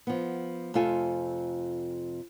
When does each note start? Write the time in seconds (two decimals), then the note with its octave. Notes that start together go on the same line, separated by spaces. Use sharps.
0.07 F3 B3
0.74 F2 C3 A3 F4 A4 G#5